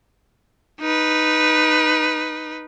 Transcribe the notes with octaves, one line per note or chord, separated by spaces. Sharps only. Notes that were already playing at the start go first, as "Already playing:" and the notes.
D#4 B4